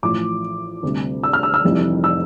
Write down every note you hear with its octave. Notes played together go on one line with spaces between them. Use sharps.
A1 A2 F3 D6
D2 C3 G3
E6
F6
E6
E6
F1 F2 E3 G3
E6